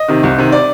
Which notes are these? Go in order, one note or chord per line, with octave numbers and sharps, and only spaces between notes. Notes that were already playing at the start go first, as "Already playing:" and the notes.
Already playing: D#5
C3 D#3
C2
C3 D#3
D5